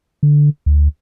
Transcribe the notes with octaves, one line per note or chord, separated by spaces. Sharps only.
D3
D2